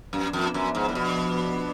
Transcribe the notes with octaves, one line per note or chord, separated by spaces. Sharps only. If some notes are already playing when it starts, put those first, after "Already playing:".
F#2 F3 B3 D4
F2
F#2
G#2
A2
B2